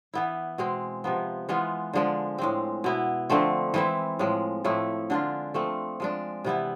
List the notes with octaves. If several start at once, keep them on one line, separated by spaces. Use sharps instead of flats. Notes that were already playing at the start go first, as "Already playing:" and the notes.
E3 B3 E4
B2 G#3 C4
C3 F3 B3
E3 G#3 B3 F4
D3 F3 G#3 D4
A2 G#3 C4
B2 B3 E4
D3 F3 A3 C4
E3 G#3 C4 E4
A2 F3 G#3
A2 F3 A3 E4
D3 G#3 D4 F4
F3 A3 C4
F3 G#3 D4
C3 E3 B3 E4